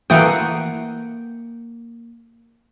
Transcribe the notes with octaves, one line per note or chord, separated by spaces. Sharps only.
E3 A3 A#3 F#5 G5 D#6